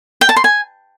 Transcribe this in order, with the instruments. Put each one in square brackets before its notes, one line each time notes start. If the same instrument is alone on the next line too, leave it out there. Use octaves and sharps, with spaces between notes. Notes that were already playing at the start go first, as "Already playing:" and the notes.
[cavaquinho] G5
A5
C6
G#5